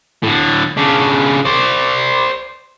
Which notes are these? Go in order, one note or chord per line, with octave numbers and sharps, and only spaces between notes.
A2 D3
C#3 D4
C5 D5